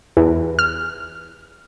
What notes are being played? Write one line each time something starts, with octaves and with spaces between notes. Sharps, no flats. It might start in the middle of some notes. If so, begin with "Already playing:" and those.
E2
F6